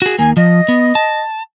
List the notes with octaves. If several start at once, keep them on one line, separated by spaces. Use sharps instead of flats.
F#4 G#4
D#2 A#3 G#5
F3 D#5
B3
A5